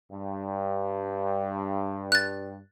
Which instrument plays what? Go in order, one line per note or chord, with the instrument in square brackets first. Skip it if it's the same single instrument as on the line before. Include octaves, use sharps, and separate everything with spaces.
[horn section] G2
[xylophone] F#6 A6